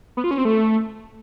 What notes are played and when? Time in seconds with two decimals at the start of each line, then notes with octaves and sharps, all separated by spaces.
0.17 B3
0.24 F4
0.31 C#4
0.38 C4
0.45 A3